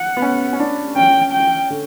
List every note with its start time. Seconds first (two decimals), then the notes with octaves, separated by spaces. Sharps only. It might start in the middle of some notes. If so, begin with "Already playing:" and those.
Already playing: F#5
0.17 B3
0.22 C#4
0.53 C#4
0.60 D4
0.96 C#4 G5
1.33 G5
1.70 D3